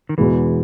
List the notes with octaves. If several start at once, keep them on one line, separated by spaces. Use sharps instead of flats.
D#3
E2 B2 E3 G#3 B3